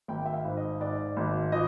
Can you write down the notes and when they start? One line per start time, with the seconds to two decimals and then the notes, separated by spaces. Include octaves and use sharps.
0.08 G#1 G5
0.26 E5
0.33 F5
0.45 G#2
0.57 D#5
0.80 G#2 D5
1.17 G#1
1.52 F3 D#5